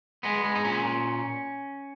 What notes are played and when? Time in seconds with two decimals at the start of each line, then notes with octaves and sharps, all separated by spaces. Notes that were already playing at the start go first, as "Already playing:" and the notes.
0.23 G#3 B3
0.44 G#3
0.55 D#4
0.64 A#2 C#4
0.85 A#2